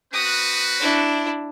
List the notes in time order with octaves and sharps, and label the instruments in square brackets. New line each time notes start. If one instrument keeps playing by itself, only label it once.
[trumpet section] C4 F#4 B4 [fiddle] D#6
[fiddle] D4 E4